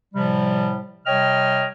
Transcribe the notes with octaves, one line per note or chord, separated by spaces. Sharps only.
A2 C3 F3 G3
C3 G3 C#5 D#5 G5 F6